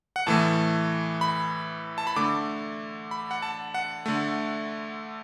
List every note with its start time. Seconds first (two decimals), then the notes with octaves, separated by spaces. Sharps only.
0.16 F#5
0.27 A2 E3 A3 A5
1.21 B5
1.98 A5
2.07 B5
2.16 D3 A3 D6
3.11 B5
3.31 F#5
3.42 A5
3.74 F#5
4.06 D3 A3